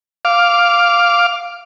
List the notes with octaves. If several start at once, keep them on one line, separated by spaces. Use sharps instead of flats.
F5 D6